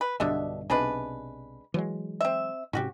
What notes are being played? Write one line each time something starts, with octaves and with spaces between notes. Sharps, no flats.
B4
B1 G2 B2 D3 D4 E5
B1 C3 G#3 D4 B4
E3 F#3 G#3
C4 E5
G#2 C3 C#4 F#4 G4